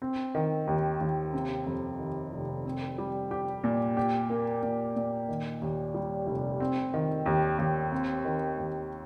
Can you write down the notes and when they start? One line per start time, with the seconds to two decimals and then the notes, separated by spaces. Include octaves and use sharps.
0.02 C4
0.35 D#3
0.67 D#2
1.01 D#2
1.33 C3
1.66 F2
1.99 D#3
2.32 F1
2.65 C4
2.98 G3
3.31 G4
3.64 A#2
3.97 G4
4.30 A#3
4.63 A#2
4.96 A#2
5.29 D#3
5.62 D#2
5.94 G3
6.27 F1
6.60 C4
6.94 D#3
7.26 D#2
7.58 D#2
7.92 C4
8.25 D#3
8.58 D#2